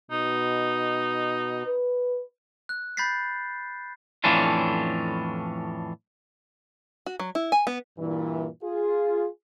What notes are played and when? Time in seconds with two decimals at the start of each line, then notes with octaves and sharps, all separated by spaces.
0.11 B2 D#4
1.66 B4
2.69 F#6
2.97 B5 G6 A6 B6 C7
4.24 F2 A2 E3 C#4 D4 F4
7.06 F#4
7.19 F#3
7.35 E4
7.52 G#5
7.67 B3
7.99 G2 A#2 E3
8.63 F4 G#4